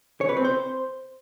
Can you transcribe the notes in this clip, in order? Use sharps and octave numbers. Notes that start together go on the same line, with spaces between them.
C#5
B4
C4
C5